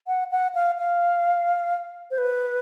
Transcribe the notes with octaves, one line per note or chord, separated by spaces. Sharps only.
F#5
F#5
F5
F5
C5
B4